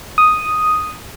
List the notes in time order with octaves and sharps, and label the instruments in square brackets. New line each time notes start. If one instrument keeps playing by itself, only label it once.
[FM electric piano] D#6